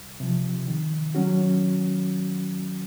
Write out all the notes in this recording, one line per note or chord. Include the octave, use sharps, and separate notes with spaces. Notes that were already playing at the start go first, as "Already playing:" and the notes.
Already playing: C2
C3 F3
D#3
F#3 C#4 F#4